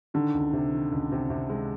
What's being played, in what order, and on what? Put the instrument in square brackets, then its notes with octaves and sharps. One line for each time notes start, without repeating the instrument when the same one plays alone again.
[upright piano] D3 [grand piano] D#3
[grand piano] C#2
C3
D#3
C#2
C3
C3
G#3